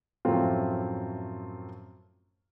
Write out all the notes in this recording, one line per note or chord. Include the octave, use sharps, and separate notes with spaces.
F#2 A2 F3 A3 C4 F4